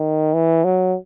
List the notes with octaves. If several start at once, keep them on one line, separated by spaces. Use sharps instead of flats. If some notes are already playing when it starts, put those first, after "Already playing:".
Already playing: D#3
E3
F#3